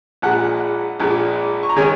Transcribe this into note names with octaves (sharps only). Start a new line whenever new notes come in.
A#1 A#2 G#3 F#5
A#1 A#2 G#3
C#6
A#5
D#3 G#3 C#4 G#5